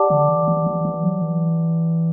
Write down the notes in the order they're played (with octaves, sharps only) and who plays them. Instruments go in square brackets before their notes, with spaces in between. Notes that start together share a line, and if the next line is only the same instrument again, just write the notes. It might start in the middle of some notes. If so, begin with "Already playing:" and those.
Already playing: [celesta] G4 D5 F#5 A5 D6
[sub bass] D3
E3
E3
E3
E3
F#3
E3